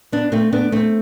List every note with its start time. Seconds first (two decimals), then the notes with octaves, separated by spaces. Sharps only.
0.12 B3 D4
0.32 A3 C4
0.53 B3 D4
0.72 A3 C4